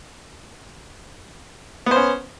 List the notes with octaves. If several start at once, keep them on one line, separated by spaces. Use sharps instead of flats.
B3 C#4 C5